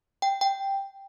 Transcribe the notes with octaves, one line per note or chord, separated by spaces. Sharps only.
G5
G5